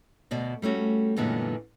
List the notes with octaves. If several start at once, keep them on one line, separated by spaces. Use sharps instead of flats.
D2 B2 D5
G3 A3 C#4 F#4
F#2 A#2 D3 E3 G#3 B3